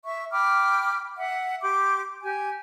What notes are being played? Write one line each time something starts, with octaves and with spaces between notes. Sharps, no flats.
E5 C#6
G5 B5 D6 F6
E5 F#5
G4 C6 D6
G4 G#5